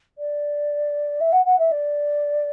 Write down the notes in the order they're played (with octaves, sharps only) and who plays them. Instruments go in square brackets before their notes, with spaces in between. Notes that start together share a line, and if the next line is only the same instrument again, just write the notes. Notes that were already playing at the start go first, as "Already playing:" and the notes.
[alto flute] D5
E5
F#5
F#5
E5
D5